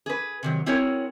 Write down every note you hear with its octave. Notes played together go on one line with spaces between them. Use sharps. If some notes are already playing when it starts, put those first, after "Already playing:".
G#4 B4
C3 D#3 F#3
C4 E4 F#4 G#4 A#4 C#5